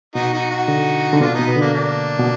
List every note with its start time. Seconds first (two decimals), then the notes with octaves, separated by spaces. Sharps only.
0.15 B2 D#4 F#4
0.33 D#4 F#4
0.51 D#4 F#4
0.68 D3
1.13 D3
1.21 B2 D4 F4
1.34 B3 D#4
1.39 B2
1.47 B3
1.56 D3 A#3 D4
1.74 A#3 D4
2.19 B2